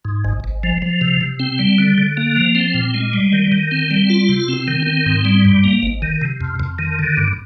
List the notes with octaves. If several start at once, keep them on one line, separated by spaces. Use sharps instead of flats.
G#2
G#1
G#1
F3
F3
C3
C3
C4
G3
D3
D3
A#3
F3
C4
A#2
G#3
G3
D#3
D#3
C4
G3
F4
C3
C4
D#3
C4
G#2
G3
G2
A#3
G#1
D#3
C3
F2
F2
D#3
D3
G2